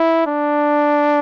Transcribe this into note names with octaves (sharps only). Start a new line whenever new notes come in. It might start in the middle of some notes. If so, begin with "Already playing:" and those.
Already playing: E4
D4